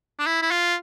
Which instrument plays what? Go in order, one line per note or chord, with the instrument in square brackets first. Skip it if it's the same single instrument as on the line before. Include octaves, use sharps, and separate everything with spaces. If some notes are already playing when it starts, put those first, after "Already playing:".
[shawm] D4
E4
E4
F4